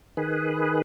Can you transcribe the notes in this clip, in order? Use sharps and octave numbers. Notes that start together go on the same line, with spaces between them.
D#3 G#4 B4